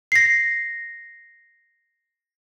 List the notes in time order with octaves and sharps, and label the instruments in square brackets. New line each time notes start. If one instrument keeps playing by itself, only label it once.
[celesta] A#6 C7